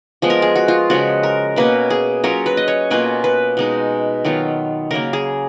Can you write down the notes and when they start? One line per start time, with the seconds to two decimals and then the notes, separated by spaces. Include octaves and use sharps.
0.22 F3 G#3 B3 F4
0.30 A#4
0.42 G#4
0.56 F#4
0.68 F4
0.90 C#3 F3 G#3 F#4
1.23 A#4
1.56 B2 A#3 C#4 B4
1.90 G#4
2.24 F#3 C#4 F4 A#4
2.46 B4
2.57 D#5
2.68 C#5
2.90 B2 A#3 C#4 F4 B4
3.24 B4
3.57 B2 G#3 D#4
4.25 D#3 F#3 B3 F4
4.91 C#3 F#3 A#3 A#4
5.13 G#4